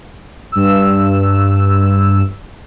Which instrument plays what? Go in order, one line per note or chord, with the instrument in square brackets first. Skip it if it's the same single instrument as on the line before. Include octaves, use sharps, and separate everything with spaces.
[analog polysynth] G2 E6